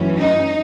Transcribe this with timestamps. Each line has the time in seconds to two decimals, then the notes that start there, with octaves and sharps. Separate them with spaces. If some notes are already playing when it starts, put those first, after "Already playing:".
Already playing: F#2 E3 A3 C#4
0.19 D#4